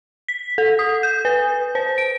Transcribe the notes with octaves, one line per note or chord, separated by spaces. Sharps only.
B6
A4
D#6
G6
B4
C5
D7